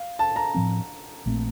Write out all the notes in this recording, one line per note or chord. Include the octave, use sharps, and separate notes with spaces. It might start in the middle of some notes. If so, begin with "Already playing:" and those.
Already playing: F5
A5
A#5
A2 F3 C4
A#1 A#2 A3 C4